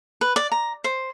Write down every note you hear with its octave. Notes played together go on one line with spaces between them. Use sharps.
B4
D5
A#5
C5